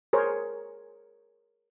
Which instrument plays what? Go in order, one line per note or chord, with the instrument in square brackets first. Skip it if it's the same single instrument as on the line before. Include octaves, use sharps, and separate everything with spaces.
[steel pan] G#4 A#4 C5 C#5